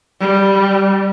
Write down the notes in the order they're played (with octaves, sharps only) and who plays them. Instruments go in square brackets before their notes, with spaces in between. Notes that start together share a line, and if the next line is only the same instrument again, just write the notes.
[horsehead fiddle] G3